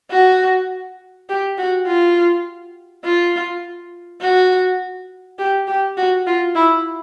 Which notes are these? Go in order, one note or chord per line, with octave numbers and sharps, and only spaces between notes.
F#4
G4
F#4
F4
F4
F#4
G4
G4
F#4
F4
E4